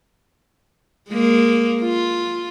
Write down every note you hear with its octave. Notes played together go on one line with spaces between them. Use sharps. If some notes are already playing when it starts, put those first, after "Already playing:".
G#3 A#3
F4